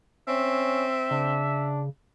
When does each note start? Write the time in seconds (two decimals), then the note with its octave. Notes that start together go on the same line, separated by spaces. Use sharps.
0.28 C4 C#4 E5
1.11 C#3 D4